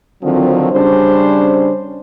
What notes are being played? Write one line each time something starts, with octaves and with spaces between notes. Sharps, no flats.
D3 D#3 F3 F#3 C4
C#3 G3 C#4 D4 C5